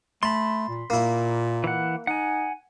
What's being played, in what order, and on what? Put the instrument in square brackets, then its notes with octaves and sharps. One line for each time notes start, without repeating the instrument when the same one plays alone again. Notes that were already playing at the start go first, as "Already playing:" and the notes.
[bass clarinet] A3 [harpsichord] A5 [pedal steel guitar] B5 C6
[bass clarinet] A#2
[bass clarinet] A#2 [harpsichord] A#3 E4
[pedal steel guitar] E3 F#5
[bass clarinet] D#4 [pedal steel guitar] F#5 G#5